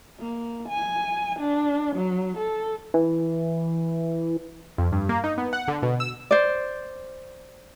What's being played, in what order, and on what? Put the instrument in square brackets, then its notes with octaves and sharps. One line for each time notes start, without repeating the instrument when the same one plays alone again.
[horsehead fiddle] A#3
G#5
D4
F#3
A4
[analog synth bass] E3
[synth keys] F2
G2
A#3
D#4
B3
F#5
D3
B2
E6
[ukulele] C5 D5